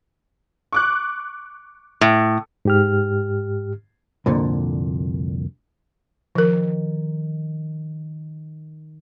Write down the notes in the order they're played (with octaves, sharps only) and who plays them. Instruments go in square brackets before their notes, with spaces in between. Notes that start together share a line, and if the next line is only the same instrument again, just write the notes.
[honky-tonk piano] C#6 D6 F#6
[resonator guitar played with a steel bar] A2
[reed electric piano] G#2 G4 F6
[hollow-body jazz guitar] C2 F2 A#2 D3
[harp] D#3 [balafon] F3 A#4